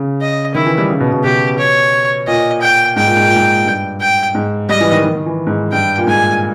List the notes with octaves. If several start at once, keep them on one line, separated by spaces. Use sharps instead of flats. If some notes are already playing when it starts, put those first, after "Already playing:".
Already playing: C#3
D#5
D#3 E4
E3
G3
C#3
B2
B2
B2 G4
C#5
A#2 D#5
G5
G#2 G5
A#2
G#2
A#2
G#2
G2
G5
G#2
G3 D#5
E3
D#3
D#3
D#3
E3
G#2
G2 G5
A#2
G#2 G#5